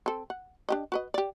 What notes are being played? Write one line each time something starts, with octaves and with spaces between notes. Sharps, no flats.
C4 A4
F#5
D4 G4 D#5
F#4 B4 D#5
G4 D5